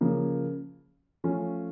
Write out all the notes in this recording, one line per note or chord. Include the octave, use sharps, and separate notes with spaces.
C#3 F3 A#3
F3 A3 C#4 F4